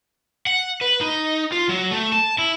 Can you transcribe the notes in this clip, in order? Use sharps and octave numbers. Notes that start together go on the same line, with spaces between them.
F#5
B4
D#4
F4
F#3
A3
A5
E4